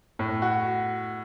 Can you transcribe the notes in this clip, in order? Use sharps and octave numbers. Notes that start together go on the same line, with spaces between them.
A2
F#4